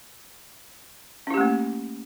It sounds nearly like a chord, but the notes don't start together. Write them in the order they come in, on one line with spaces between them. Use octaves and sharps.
C#4 E4 G4 A3 A#3